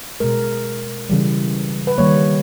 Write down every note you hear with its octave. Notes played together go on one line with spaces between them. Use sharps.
B2 G#3 A#4
C#3 E3 G3
B4
D#3 G3 A#3 C#5